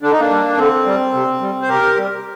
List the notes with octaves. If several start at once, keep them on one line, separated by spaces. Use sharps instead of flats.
D3 D4
D#4
A#3 D4
G3
D3 C4
G3
C3
G3
C5
C3 G4 A#4
G3